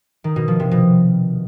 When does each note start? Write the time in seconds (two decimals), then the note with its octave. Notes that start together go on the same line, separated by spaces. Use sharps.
0.24 D#3
0.36 B2
0.48 F3
0.60 C3
0.71 B2